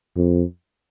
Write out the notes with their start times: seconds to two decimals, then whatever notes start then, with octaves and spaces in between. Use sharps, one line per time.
0.16 F2